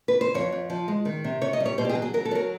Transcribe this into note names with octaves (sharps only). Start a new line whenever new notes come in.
B4
C5
F2 C#5
F2
F3
G#3
D#3
C3
C3 C#5
D#5
G3
C#5
B2 C5
G4
G#4
F#3
G#4
F#3 A#4
A4
F#3 A#4